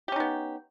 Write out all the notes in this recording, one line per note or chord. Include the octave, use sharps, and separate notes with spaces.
B3 C#4 D#4 G4